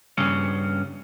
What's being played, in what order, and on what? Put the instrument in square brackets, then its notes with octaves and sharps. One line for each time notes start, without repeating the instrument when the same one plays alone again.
[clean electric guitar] G2 C#3 C#4